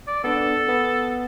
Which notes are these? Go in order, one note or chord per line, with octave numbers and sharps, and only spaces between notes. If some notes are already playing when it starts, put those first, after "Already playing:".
D5
B3 D4 A4
B3